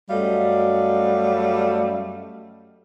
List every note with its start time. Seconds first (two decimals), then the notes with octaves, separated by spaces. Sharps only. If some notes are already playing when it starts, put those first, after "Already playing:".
0.10 F#2 F#3 G3 A3 D#5 F5